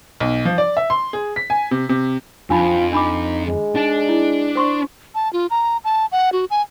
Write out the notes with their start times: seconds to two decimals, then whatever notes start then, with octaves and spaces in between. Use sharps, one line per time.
0.20 B1
0.45 F3
0.58 D5
0.77 E5
0.90 C6
1.13 G#4
1.36 B6
1.50 G#5
1.71 C3
1.89 C3
2.50 F2 D4 D#4 F4 B5
2.93 D4 D#4 B5 D6
3.46 G#3
3.76 D4 D#4
4.09 E4
4.56 C5 C6 C#6
5.15 A5
5.33 F4
5.50 A#5
5.84 A5
6.12 F#5
6.33 F#4
6.50 G#5